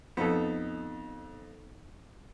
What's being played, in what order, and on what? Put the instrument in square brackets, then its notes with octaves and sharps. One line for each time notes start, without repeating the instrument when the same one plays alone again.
[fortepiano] F2 [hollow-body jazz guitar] B3 D#4 A4